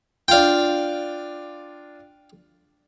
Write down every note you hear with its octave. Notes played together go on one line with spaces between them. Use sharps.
D4 F4 F5 G5